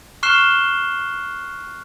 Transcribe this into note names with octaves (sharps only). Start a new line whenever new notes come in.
C#6 F6 F#6 C7 E7 G7